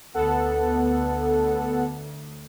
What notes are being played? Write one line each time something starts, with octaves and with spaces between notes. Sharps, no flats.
D2 B3 A4 F#5